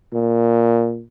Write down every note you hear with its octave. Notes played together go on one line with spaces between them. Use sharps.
A#2